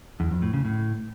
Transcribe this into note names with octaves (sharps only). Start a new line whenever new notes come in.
E2
F2
A2
C#3
A2